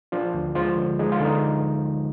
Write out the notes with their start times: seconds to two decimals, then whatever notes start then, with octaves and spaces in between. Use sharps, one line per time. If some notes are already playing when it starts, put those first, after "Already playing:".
0.12 F3 D4 F4
0.34 D2
0.55 F3 G#3 F4
0.76 D3
0.99 G#3 D#4
1.12 F4
1.20 D3
1.25 D#4